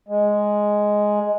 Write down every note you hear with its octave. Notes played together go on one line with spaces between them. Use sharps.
G#3